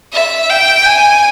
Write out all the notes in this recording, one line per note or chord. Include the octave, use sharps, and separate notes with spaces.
E5
G5
G#5